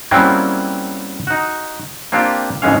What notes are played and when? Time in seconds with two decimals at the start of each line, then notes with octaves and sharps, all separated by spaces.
0.11 F#3 G3 A#3 C4 C#4 E4
1.27 D#4 F#4
2.12 A#3 C4 D4 F4 G4
2.62 G#1 B2 E3 G#3 C#4 F5